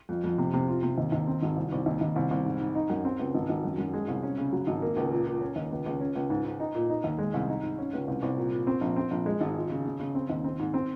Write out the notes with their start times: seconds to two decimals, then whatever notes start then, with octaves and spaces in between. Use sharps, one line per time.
0.09 F2
0.24 F2
0.38 C3
0.53 C3
0.68 F4
0.83 C3
0.98 D#2
1.12 D#2
1.27 C4
1.42 G#1
1.56 C2
1.72 C2
1.86 D#2
2.01 D#2
2.16 C2
2.31 C2
2.45 G#2
2.60 G#2
2.75 D#4
2.90 F#2
3.05 C4
3.19 C#2
3.34 G#1
3.49 G#1
3.64 F#2
3.78 F#2
3.94 G#3
4.08 C2
4.23 C#4
4.38 C#3
4.52 F#3
4.67 G#1
4.82 A#3
4.97 C#2
5.12 A#2
5.26 A#2
5.41 C#4
5.56 D#2
5.71 C#2
5.86 C#2
6.01 C#4
6.15 C#2
6.30 G#2
6.45 G#2
6.60 D#4
6.75 A#2
6.89 D#4
7.04 D#2
7.19 G#3
7.34 C2
7.49 D#4
7.63 G#2
7.78 C#4
7.93 C#2
8.08 C2
8.22 C2
8.37 A#2
8.52 A#2
8.67 C4
8.81 A#1
8.96 C4
9.11 A#1
9.26 G#3
9.41 G#1
9.55 F4
9.70 C#3
9.85 C#3
10.00 C#3
10.15 C4
10.30 D#2
10.44 C4
10.59 G#2
10.74 C4